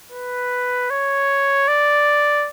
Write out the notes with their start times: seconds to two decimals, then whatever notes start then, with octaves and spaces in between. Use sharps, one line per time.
0.12 B4
0.90 C#5
1.68 D5